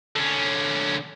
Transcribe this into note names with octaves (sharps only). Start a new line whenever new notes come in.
D3 C#4